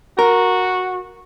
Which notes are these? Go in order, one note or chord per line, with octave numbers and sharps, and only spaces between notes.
F#4 A#4